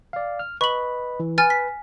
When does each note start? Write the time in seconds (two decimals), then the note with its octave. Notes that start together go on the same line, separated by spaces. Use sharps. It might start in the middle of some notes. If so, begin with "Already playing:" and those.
0.13 D5 F5
0.39 F6
0.61 B4 D#5 B5 C#6 F#7
1.20 E3
1.38 B4 G#5 F6 A6
1.50 B6